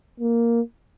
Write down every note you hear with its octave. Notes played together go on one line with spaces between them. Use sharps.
A#3